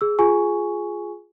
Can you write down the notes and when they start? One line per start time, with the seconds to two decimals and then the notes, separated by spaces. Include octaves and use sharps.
0.01 G#4 E6
0.19 F4 G#4 G#5 C#6